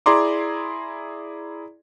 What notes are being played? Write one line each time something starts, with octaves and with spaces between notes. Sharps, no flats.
E4 G#4 D5 A#5 C6 D6